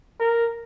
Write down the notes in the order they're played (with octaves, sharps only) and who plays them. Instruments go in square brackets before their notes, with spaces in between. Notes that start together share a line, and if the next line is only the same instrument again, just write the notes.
[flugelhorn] A#4